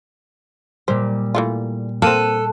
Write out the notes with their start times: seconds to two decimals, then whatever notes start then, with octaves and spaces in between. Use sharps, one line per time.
0.88 A#2 G3 C5
1.35 E3 A3 F4
2.02 A#3 C4 A4 F#6 D#7 E7